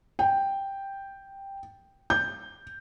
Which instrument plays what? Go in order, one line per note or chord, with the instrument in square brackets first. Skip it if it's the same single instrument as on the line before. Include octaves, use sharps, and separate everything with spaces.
[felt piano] G5
G6